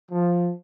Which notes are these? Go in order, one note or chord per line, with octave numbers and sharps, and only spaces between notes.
F3